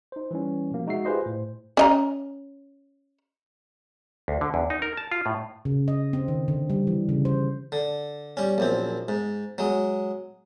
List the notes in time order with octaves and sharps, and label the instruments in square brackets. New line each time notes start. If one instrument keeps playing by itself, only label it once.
[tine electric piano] D#4 C5
E3 G3 C#4
B2 F3 A#3
G#3 D#4 F#4 E5 C7
F4 G4 G#4 B4 C5 D#5
A2 C5
[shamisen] C#4 D#5 A#5
[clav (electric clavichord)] D2
D3
E2
D#4
A#4
A5
F4
A2
[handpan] C#3
D#5
C4
D#3
D3
G3
E3
C#3
C5
[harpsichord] D3
G3 C#4
A#1 F#2 C4
G#2
F#3 G#3